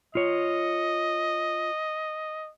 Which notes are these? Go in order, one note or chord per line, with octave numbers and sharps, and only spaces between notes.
F4 C#5 D#5